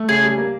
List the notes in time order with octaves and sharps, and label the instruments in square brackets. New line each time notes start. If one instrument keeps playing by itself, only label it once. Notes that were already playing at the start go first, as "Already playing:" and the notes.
Already playing: [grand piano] A3
[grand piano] C#3 [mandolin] G#4
[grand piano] G3
A#3